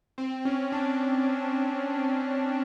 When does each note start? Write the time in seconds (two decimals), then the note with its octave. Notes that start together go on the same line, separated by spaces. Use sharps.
0.18 C4
0.45 C#4
0.72 D4